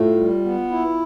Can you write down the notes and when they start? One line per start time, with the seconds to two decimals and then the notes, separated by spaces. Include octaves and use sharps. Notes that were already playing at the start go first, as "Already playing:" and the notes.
Already playing: A2 A3 F4
0.17 G3
0.44 B3
0.71 E4